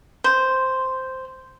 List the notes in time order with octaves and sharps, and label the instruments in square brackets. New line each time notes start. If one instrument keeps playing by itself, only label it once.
[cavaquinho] C5